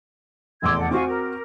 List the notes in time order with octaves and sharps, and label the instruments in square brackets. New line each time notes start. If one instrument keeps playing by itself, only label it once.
[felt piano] F1 E2 D6 [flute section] C6 E6 G#6
[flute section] A4 D5 F#5
[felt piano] C4 F#4 [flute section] F4 G#5 C#6
[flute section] A#4